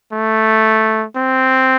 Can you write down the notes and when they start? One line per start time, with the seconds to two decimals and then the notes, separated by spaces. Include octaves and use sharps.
0.12 A3
1.16 C4